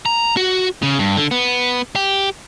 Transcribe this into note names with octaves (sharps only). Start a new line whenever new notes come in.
A#5
F#4
C#3
G2
D3
B3
G4